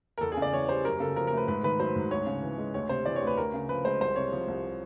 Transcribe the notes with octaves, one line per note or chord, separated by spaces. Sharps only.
A#4
E2 A4
G#4
C#3
D5
E3 C#5
G3 C5
F#2 A#4
C#3 A4
F3 A#4
A#4
A3
B4
G#2 B4
D#3 B4
F#3 C5
G#2
D2 C#5
C#3
E3
G#3
D2 C#5
C3 C5
E3 D5
C#5
D2
B4
D2 A#4
C#3
F3 B4
G#3 C5
C2 C5
C3 C#5
F3
C2